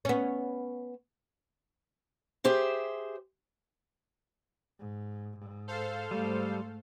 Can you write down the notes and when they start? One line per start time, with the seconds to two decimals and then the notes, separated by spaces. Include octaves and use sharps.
0.05 B3 C#4
2.44 G4 G#4 C5 E5
4.79 G#2
5.37 G#2
5.67 A4 C5 F5
6.11 G#2 G3 A3